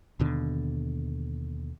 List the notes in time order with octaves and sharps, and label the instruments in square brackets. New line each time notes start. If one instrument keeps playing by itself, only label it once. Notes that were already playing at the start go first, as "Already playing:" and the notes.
[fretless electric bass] D#2 B2 D3